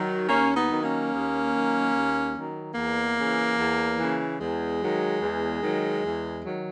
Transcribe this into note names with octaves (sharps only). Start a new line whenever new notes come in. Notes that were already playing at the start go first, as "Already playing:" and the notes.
Already playing: D#3 F#3
D#2 A#3 C#4
B3 D#4
D#3 F#3
A#3 C#4
D#2
D#3 F#3
D#2
D#3 F#3
E2 A#3
C#3 E3
E2
C#3 E3
E2 G#3
D#3 F#3
E2
D#3 F#3
E2
D#3 F#3